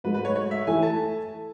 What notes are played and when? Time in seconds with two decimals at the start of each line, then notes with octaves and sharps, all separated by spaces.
0.04 G#2 F#3 A3 B4
0.14 B4
0.25 C#5
0.35 C#5
0.51 E5
0.67 E3 A3 E4 A4 G#5
0.82 A5